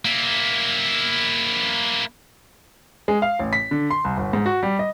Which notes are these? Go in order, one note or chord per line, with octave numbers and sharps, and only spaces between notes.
A#3 E4
G#3
F5
A1
B6
D3
C6
C2
G1
G#2
F#4
G3
D#5